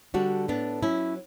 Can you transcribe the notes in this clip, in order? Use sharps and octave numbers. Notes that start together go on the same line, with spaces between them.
D3 G3 D4 F#4
A2 B3 D4
F#3 C#4 E4